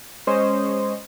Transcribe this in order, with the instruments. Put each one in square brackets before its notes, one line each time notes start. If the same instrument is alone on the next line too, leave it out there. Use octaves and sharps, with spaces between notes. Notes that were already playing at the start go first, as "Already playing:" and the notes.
[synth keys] G#3 C#4 C5 C#5 D#5